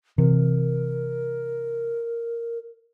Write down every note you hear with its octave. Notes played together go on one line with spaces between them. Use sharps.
C3 E3 A#4